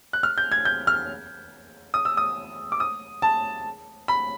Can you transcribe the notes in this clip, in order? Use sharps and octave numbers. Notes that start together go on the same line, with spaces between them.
F#6
F6
G6
G#6
G6
F6
D#6
E6
D#6
D6
D#6
A5
B5